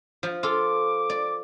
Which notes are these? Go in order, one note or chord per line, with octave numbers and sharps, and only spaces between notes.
F3
F4 A4 D6
D5